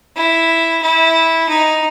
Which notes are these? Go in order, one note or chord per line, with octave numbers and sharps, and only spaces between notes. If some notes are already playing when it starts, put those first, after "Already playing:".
E4
E4
D#4